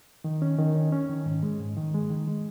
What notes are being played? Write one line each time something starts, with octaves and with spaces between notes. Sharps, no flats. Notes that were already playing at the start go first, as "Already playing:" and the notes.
D#3
C#4
D#3
C#4
C#4
D#3
G#2
G#3
G#2
D#3
G#3
D#3
G#3